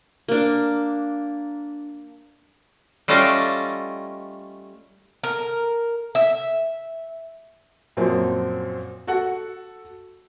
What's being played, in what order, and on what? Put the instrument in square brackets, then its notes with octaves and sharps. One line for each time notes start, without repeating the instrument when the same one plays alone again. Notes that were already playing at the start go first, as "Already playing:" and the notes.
[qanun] A#3 D4
[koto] G3 A3 C#4 F4 D5 D#5
[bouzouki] A#4
E5
[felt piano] F#2 A#2 F3 F#3 C4
F#4 A4 F#5